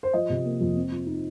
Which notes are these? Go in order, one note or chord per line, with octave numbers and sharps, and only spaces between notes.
C5
F3 D#5
C3
A#3
F2
C4
F3
D#4